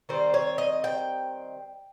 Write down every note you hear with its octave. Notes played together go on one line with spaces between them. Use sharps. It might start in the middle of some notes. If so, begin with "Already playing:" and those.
D#3 G3 C4 C5
C#5
D#5
G5